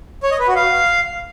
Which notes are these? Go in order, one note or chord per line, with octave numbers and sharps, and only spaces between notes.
C#5
D#5
B4
F#4
F5